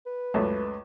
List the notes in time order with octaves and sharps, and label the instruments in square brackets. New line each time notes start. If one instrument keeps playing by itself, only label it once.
[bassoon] B4
[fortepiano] C#2 F#2 A3